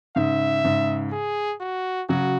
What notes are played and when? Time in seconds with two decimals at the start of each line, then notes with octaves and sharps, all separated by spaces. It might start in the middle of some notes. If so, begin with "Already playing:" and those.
0.16 G#2 C#3 E5
0.64 G#2 C#3
1.12 G#4
1.61 F#4
2.09 C#3 F#3 F#4